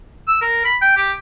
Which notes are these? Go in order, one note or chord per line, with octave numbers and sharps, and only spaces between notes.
E6
A#4
B5
G5
G4